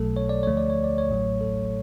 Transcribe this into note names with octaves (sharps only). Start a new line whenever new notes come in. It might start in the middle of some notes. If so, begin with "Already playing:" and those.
Already playing: B1 B2 F#3 A3 A4
C#5
D5
D2 D3 F3 A3 C#5
D5
C#5
D5
C#5
A1 A2 F#3 A3
A4